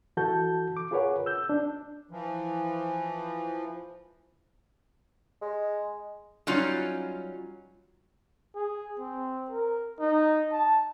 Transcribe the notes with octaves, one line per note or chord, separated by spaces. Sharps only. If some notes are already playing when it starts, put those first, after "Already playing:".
E3 F#4 A4 A5 G6
D6
F4 G#4 A#4 B4 C#5 F#5
E6 G6
D4
E3 F3
G#3
F#3 G3 C#4 D#4 F4
G#4
C4
A#4
D#4
A5